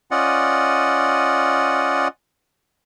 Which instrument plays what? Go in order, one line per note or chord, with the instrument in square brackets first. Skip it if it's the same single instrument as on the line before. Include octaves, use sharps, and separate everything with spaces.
[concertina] C#4 F4 D5 D#5 F#5